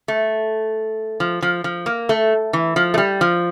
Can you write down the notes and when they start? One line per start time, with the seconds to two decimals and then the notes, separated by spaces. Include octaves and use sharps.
0.08 A3
1.20 F3
1.42 F3
1.64 F3
1.86 A#3
2.09 A3
2.53 E3
2.76 F3
2.94 A3
2.98 G3
3.21 F3